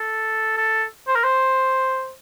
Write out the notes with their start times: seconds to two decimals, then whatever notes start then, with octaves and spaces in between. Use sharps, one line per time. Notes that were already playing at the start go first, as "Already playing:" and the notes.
Already playing: A4
0.57 A4
1.08 C5
1.15 A#4
1.24 C5